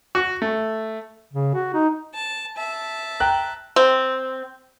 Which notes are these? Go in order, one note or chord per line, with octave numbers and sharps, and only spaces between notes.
F#4
A3
C#3
F#4
D#4
A5
E5 A5
G5 A#5 F#6
C4